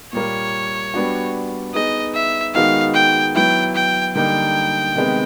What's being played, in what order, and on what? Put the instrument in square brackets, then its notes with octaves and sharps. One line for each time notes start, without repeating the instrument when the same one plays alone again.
[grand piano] A#2 G3 A#3 [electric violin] C#5
[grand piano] G3 B3 D4 F#4
[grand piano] B3 D#4 G#4 [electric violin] D#5
[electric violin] E5
[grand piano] D#3 G#3 B3 D#4 F#4 [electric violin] F5
[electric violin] G5
[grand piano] F#3 B3 E4 [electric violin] G5
[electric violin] G5
[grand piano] D3 G3 A#3 D#4 [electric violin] G5
[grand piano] C3 D#3 G#3 B3